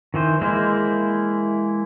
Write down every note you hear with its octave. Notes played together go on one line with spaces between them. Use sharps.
D#3 E3 C5
E3 G#3 A#3 E4 C5